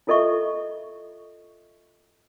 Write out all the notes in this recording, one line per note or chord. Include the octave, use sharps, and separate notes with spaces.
E4 F4 A4 D#5 E5 C#6